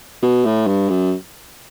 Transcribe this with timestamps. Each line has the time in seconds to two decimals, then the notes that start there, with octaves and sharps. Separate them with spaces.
0.22 B2
0.45 A2
0.67 G2
0.89 F#2